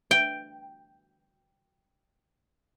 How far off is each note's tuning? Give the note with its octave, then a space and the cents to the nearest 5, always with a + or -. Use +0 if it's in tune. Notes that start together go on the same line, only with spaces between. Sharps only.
G5 +0